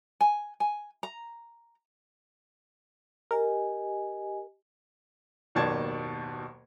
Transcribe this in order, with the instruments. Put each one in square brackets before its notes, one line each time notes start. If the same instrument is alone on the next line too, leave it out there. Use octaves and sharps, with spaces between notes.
[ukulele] G#5
G#5
A#5
[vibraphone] G4 D#5 G#5 [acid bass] A#4
[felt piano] F#1 D#2 B2 D5 A5 G#6